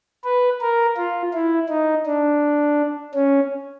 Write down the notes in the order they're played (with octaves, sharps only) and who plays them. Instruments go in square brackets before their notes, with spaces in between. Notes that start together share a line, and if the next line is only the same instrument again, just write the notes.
[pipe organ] B4
A#4
F4
E4
D#4
D4
C#4